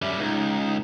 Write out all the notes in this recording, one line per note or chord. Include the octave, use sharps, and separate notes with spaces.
F#2 G3 E5
C#2 D#4